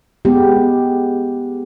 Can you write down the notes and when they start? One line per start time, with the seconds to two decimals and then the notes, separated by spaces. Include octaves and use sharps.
0.25 G#3 B3 G4